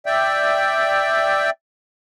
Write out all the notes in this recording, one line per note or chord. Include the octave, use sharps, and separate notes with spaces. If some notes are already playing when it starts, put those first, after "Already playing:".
D5 E5 G5